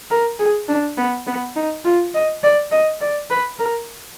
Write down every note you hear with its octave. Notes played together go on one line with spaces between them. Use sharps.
A#4
G#4
D4
B3
B3
D#4
F4
D#5
D5
D#5
D5
B4
A#4